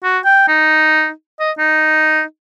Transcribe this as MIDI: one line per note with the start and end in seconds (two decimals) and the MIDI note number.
0.04 0.19 66
0.25 0.46 79
0.48 1.10 63
1.40 1.51 75
1.59 2.22 63